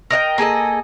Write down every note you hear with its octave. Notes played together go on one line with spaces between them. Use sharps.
A#4 D#5 F5 G5
A#3 G#4 A4 D#5